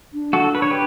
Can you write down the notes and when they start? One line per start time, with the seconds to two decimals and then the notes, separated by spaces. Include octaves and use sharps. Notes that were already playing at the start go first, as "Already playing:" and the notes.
0.13 D4
0.33 F#4 A4
0.55 B4
0.62 C#5
0.71 G4 B4